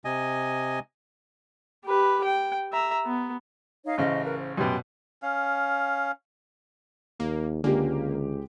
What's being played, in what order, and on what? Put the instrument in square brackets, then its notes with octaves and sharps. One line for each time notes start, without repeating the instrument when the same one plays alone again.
[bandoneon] C3 D#5 G#5
[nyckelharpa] G4 B4
G5
E5 A#5
B3
[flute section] D#4 C#5 F5
[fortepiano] A1 C#3 [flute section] C5 D#5
[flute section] A#4 B4
C5
[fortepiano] F#2 B2 [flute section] G4 G5 C6
[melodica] C#4 F5
[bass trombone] D#2 [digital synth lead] A#3
[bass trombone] C#2 [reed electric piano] D3 [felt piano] G#3 G4 [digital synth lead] A#3